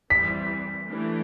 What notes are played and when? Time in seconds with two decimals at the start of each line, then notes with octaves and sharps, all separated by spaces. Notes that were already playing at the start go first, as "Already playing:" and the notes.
0.10 E3 G3 C4 B6
0.88 E3 A3 D4 G4